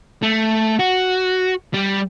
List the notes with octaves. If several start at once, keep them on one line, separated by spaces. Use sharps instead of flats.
A3
F#4
G3